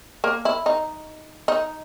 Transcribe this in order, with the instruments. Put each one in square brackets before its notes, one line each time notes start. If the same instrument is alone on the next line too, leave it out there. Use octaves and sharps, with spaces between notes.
[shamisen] A#3
E4
D#4
D#4